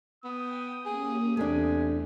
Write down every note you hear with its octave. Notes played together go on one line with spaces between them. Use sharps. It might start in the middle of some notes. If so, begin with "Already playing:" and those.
B3 G5 D#6
A#3 C#4 G4 G#4
E2 C3 A3 D4 G#5